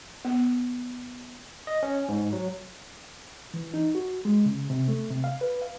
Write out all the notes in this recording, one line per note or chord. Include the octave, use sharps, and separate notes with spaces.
B3
D#5
C#4
G#2
F#3
E3
D#4
F#4
G#3
C#3
C3
A3
C3
F5
B4
F5